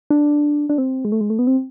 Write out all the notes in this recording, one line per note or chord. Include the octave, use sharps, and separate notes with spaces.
D4
D4
C4
G#3
A3
G#3
A3
B3
C4